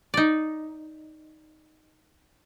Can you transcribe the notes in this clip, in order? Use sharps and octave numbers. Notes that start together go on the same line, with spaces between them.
D#4 D5